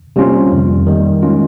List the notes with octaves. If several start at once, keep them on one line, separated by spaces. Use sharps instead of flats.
C3 G3 A#3 C#4 F4
F2 D#3 G3
D#3 G3 A#3
D#3 G#3 C#4 F4